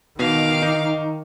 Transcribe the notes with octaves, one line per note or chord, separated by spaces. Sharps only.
B2 D#3 F5 D6
D#4